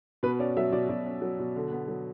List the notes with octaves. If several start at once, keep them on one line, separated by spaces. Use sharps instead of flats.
B2 B4
C#4 D5
F#3 E5
B2 D5
B2 D5
C#4
F#3
B2
D3
B3
F#3